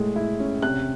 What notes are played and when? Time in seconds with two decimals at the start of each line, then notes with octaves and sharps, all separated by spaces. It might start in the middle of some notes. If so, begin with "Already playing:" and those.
Already playing: A2 G#3 A3
0.16 E4
0.40 C#4
0.62 C3 F#6